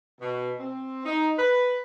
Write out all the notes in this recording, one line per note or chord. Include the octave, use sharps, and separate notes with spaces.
B2
C4
D#4
B4